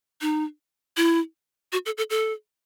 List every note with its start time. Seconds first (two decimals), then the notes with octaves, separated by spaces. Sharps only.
0.21 D#4
0.97 E4
1.72 F#4
1.86 A4
1.98 A4
2.10 A4